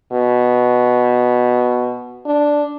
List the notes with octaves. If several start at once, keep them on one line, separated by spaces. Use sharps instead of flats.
B2
D4